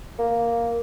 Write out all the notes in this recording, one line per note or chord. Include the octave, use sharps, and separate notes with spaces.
A#3